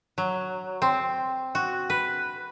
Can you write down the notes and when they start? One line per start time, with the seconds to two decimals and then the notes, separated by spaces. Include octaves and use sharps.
0.18 F#3
0.82 C4
1.55 F#4
1.90 B4